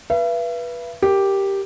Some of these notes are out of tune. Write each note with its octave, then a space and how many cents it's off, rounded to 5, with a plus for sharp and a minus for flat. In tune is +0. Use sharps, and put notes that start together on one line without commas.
B4 -20 E5 +45
G4 +0 A#4 +0